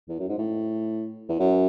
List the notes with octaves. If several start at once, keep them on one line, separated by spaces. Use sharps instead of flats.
E2
F#2
G#2
A2
E2
F#2